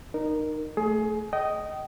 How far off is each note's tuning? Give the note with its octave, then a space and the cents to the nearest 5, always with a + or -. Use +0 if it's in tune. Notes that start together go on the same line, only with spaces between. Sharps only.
D#4 -25 A#4 +0
A3 +0 G#4 +25
D#5 +0 G5 -30